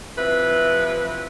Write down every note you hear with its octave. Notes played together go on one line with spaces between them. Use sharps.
C3 E3 F3 B4